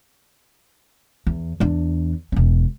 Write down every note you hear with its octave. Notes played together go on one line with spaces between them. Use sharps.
E2
E2 D4
E1 C#4